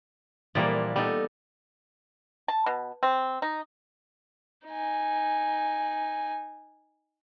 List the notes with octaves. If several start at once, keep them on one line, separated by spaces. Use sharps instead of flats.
A#2 E3 F3 G3 A#3 D5
G3 B3 D#4 A4
A5
B2
C4
D#4
D#4 G#5